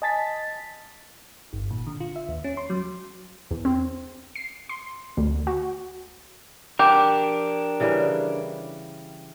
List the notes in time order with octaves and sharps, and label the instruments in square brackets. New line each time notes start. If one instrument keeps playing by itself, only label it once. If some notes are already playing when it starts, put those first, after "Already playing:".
[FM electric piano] D#5 G#5 A5 A6 B6
G1
A#2
D3
F4
E5
D#2
C#4
C6
F#3
[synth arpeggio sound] E2
C4
C7
C6
D2
F#4
[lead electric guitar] D4 A#4 [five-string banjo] G4
[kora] C#3 E3 G3